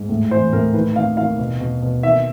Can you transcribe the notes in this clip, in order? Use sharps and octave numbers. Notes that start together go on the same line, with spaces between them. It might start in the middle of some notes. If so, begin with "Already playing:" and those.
Already playing: G#2
A2
E3 C5
A2 A#4
D#3 B4
D#3 F5
D#3 F5
B2
B2
B2
D#3 E5